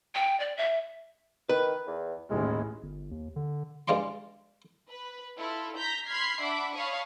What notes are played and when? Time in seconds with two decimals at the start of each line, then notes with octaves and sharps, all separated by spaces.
0.15 G5
0.40 D5
0.57 E5
1.49 D#3 B4
1.87 E2
2.31 A1 D#2 E3 G#3
2.83 G1
3.11 D#2
3.36 D3
3.88 G2 G#3 F4 D5 C6
4.89 B4
5.37 E4 F4 A4
5.77 A#5 G6 A#6 B6
6.06 B5 C6 F6 G#6 B6 C7
6.40 D4 E5 F#5 B5 D6
6.73 C#5 F5 A5 B5 C#6 D#6